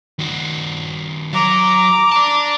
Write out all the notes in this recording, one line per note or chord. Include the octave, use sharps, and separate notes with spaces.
D#3 F#4
F#3 A#5 D6
D5 A5